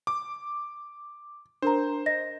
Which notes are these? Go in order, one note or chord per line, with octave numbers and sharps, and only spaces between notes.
D6
D4 A#4 C5 A#5
D#5 A#6